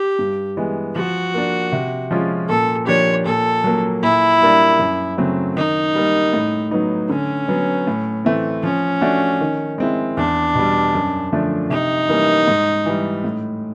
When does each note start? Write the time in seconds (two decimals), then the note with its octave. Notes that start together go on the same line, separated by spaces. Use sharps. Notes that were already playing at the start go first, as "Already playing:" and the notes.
Already playing: G4
0.19 G2
0.57 E3 G#3 B3
0.96 F3 F#4
1.34 A#3 D4
1.72 C3
2.11 F3 G#3 C#4 F4
2.49 A#2 A4
2.87 F3 A#3 D4 G4 C#5
3.26 A#2 A4
3.64 F#3 A#3
4.03 A#2 E4
4.42 G3 A#3 D4
4.79 F#2
5.18 C#3 F#3 A3 C4
5.56 D#3 D#4
5.95 G3 A#3
6.33 A2
6.71 F#3 B3 D#4
7.09 D3 C#4
7.48 F#3 B3
7.87 A2
8.25 E3 A3 C4
8.63 F3 C#4
9.01 A3 D4 F#4
9.40 D#3
9.78 G#3 C4 E4
10.17 E2 D4
10.55 B2 G3
10.94 F#2
11.32 D3 F3 A3 D4
11.70 C3 D#4
12.09 E3 G3 A#3 C#4
12.48 G#2
12.86 E3 G3
13.24 A2